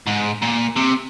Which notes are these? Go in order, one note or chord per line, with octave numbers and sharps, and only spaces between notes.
G#2
A#2
C3